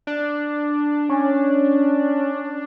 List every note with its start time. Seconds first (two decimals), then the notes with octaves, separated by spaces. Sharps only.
0.07 D4
1.09 C#4